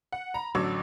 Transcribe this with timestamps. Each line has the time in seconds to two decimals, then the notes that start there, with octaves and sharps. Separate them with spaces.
0.12 F#5
0.34 A#5 B5
0.55 A1 D3 F#3 C#6 D6 E6